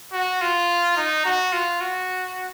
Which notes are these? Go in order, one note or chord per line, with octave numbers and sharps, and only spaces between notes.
F#4
F4
D#4
F#4
F4
F#4